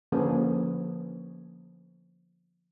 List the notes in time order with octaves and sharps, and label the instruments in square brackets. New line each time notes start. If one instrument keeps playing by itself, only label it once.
[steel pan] D3 F3 A#3 C#4 G#4 B4